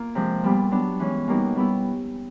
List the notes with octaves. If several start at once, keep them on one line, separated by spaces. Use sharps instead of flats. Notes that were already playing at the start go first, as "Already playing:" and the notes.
Already playing: A#3 F4
C3 F3 G#3
A#2 G3 B3
F#3 B3 D4
E3 G#3 C#4
B2 G3 A#3 D#4 F#4
G3 B3 E4